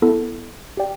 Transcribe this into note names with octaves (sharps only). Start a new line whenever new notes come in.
B3 E4 A4
G4 D5 G5